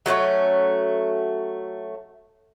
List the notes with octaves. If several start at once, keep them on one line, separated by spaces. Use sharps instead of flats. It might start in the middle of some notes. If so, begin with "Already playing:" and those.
F#3 A3 C4 C#4